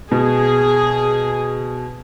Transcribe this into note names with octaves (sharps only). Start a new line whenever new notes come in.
B2 G#4